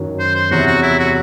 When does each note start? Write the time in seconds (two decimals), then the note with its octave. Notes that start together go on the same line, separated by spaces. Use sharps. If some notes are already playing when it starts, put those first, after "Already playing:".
Already playing: F#2 D#3 F#3
0.19 C5
0.35 C5
0.51 E2 C3 F#3 F#4
0.67 F#4
0.83 E4
0.99 F#4